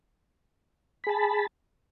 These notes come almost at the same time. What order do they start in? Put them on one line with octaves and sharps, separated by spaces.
B5 G#4 A5